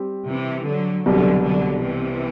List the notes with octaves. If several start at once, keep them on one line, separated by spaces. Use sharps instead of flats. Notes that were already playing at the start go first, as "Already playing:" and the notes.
Already playing: G3 C4 G4
C3 E3
D3 F#3
C2 B2 D3 F#3 G3
D3 F#3
C3 E3